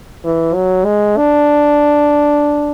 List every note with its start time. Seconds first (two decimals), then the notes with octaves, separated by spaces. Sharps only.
0.25 E3
0.55 F#3
0.86 G#3
1.17 D4